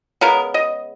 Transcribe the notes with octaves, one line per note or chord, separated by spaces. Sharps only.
C#3 G#3 B3 A#4
D#5